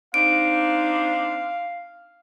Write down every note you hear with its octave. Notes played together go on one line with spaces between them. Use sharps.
C4 D4 D#4 F5 D7